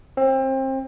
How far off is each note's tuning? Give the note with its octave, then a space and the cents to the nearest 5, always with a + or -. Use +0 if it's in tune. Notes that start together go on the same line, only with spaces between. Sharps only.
C4 +30